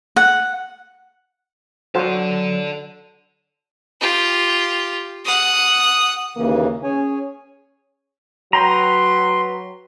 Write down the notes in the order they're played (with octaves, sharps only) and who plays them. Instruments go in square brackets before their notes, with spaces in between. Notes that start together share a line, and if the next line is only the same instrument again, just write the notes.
[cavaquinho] F#5
[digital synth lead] F#3 [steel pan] F#4 C5 [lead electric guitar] A4 D5
[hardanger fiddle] F4 G4
F#5 D#6
[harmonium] D#2 C#3 E3 [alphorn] A#3
[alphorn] C#4 [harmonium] G#4 C#5 G#5
[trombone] F#3 [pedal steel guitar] B4 G5 A#5 [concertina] C6